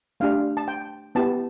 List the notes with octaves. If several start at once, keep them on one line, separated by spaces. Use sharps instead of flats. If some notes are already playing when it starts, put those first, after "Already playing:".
A3 D4 G4 F5
A5
G5
B3 E4 G4 A5